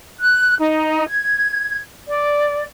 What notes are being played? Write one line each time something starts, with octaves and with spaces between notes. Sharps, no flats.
F#6
D#4
G#6
D5